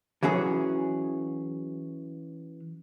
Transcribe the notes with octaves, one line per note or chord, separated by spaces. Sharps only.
E3 F#3 C#4 G#4